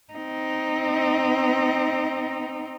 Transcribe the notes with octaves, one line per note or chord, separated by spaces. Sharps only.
C4 D#4